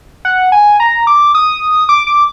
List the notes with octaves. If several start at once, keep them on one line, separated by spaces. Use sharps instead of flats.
F#5
G#5
A#5
D6
D#6
D6
D6